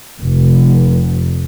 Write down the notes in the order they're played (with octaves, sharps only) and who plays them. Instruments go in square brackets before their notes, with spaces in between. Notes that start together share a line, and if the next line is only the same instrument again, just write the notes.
[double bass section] F1